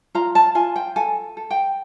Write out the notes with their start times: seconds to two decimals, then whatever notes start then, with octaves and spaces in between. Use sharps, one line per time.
0.15 F4 A#5
0.35 A5
0.55 F4 G#5
0.76 G5
0.96 A4 G#5
1.37 A4
1.50 G5